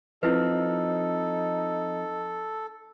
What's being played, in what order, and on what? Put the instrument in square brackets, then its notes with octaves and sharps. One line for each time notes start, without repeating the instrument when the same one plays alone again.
[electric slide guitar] F3 C4 [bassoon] D#4 [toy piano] E4 B4 [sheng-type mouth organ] A4